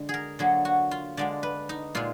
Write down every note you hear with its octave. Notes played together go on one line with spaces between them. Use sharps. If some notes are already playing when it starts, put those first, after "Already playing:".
Already playing: D3 G#3
G#4 A#4
D3 F#3 A#3 G#4
F#4
F4
D3 G#3 D4 D5
B4
D#4
A#2 G#3 F4